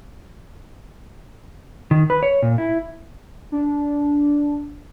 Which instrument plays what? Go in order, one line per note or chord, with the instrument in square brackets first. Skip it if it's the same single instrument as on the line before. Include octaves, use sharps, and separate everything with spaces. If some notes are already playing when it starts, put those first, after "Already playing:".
[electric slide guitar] D#3
B4
C#5
A#2
E4
[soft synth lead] D4